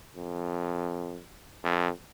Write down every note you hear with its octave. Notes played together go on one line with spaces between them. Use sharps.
F2
F2